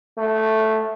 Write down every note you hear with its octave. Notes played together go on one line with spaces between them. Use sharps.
A3